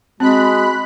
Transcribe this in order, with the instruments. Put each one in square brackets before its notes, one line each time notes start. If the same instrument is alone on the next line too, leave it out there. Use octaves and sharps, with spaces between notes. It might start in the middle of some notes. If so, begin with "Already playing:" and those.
[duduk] G#3 [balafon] C4 [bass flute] F#4 [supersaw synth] B5 F#6